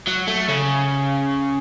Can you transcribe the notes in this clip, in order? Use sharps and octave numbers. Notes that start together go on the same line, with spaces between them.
F#3
A3
C#3